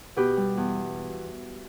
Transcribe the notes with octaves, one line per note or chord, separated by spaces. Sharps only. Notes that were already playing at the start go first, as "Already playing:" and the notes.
B2 G4 B4
G3
E2